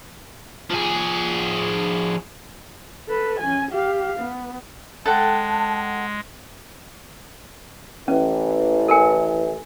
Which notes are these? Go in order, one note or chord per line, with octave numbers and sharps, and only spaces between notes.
F3 G#4
A4 B4
C#4 G#5
G4 F5
B3
G#3 A4 F#5 G5 A5
A1 E3 C#4
A4 A#4 G#5